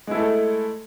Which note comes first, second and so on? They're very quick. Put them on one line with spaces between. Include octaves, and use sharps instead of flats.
G#3 E4 A3 A4